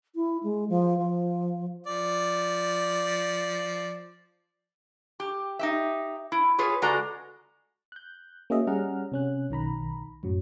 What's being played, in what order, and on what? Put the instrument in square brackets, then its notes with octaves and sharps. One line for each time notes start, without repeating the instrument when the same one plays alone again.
[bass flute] E4
G#3
F3
F3
[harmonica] F3 D5
[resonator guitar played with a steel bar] G4
D#4 G4 E5
E4
F4 G#4 B4 C#5
C#3 G#3 F#4 A4 D5 A#5
[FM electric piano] F#6 G6
A#3 C#4 F#4 G#4 D#5 E5
G3 C#4 G#4 F#5 A#5 F6
C3 C#4 F#6
B1 D#3 A#5 B5
F#2 A2 F#3